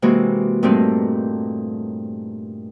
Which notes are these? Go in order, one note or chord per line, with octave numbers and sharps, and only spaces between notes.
C3 E3 G#3 A#3 F#4
G2 A#2 G3 A3 C4 D#4